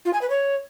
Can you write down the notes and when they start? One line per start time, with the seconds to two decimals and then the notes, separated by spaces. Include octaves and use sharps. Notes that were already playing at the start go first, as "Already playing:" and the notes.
0.05 F4
0.13 G#5
0.22 B4
0.30 C#5